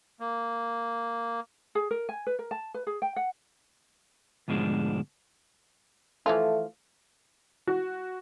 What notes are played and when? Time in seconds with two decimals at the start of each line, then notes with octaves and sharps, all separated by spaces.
0.20 A#3
1.75 G#4
1.91 A#4
2.09 G#5
2.27 B4
2.39 A#4
2.51 A5
2.74 B4
2.87 G#4
3.02 G5
3.16 F#5
4.48 D2 G#2 B2 F3 G#3 D4
6.26 E3 F3 A3 F4
7.67 F#4